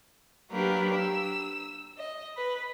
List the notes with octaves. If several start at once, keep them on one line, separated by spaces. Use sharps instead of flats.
F#3 A#3 D4 G4 A#4 B4
E6
D#5
B4